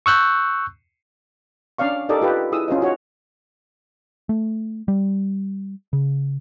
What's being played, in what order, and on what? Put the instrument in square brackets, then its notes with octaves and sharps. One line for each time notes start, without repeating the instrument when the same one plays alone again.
[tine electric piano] C#6 E6 F#6 G6
[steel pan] C#4 D4 D5 F5 C#6
D#4 G4 A4 A#4 D5 D#5
F4 G4 B4 D#5
E4 G#4 D#6 E6
C#4 F4 C5 D#5
D#4 F#4 C#5
[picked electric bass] A3
G3
C#3